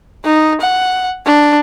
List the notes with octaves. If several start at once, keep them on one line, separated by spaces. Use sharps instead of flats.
D#4
F#5
D4